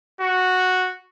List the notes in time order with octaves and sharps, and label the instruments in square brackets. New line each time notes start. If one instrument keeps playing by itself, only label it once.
[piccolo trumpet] F#4